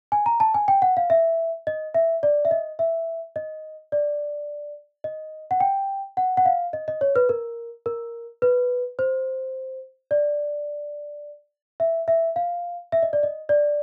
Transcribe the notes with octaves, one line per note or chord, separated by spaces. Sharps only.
G#5
A#5
A5
G#5
G5
F#5
F5
E5
D#5
E5
D5
E5
D#5
E5
D#5
D5
D#5
F#5
G5
F#5
F#5
F5
D#5
D#5
C#5
B4
A#4
A#4
B4
C5
D5
E5
E5
F5
E5
D#5
D5
D#5
D5